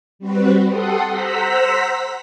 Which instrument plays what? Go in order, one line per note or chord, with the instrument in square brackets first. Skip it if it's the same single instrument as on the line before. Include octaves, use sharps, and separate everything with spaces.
[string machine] G3 C4 F#4 B4
G4 A4 F#5 C6 D#6
C5 F#5 A#5 E6 B6